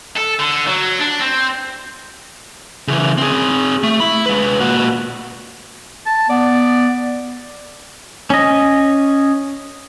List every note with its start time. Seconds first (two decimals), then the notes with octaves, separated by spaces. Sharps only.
0.16 A4
0.39 D3
0.67 F#3
1.00 D4
1.20 C4
2.88 C#3 E3
3.18 C4 G#4
3.83 A3
4.00 E4 B5
4.26 G#3 B4
4.60 A#2 F#4
6.06 A5
6.29 B3 D5
8.30 C#4 D#5